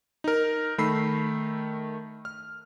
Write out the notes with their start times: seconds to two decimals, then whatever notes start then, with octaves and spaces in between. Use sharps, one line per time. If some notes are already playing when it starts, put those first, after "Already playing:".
0.24 D#4 A#4
0.78 D#3 A3 B5 E6 C7
2.25 F6